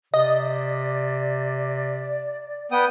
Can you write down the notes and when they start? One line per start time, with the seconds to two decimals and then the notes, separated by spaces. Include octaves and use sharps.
0.14 C3 D5 D#5
2.71 B3 G5 D#6